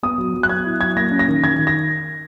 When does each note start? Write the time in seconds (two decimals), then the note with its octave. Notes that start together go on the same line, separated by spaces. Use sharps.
0.03 B3 D#6
0.18 F#3
0.34 F#3
0.43 F#6
0.49 B3 G#6
0.65 E4
0.81 F#3 G#6
0.96 A#3 A#6
1.12 C#4
1.19 A#6
1.28 D#3
1.43 D#3 G#6
1.59 D#3
1.67 A#6